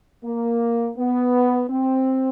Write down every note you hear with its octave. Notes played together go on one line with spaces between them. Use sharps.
A#3
B3
C4